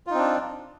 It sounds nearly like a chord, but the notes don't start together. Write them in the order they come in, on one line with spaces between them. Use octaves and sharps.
F4 D#4 C4 D4